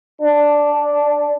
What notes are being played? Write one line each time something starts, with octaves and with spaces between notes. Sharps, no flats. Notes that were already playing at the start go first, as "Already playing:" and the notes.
D4